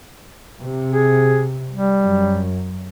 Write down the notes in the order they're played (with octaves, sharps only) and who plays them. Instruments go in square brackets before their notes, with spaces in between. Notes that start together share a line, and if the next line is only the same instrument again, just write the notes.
[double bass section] C3
[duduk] G#4
G3
[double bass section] F#2